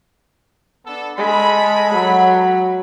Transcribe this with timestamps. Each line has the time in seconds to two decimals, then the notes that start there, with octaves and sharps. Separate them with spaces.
0.86 B3 D4 A4
1.18 G#3 A4 B5
1.94 F#3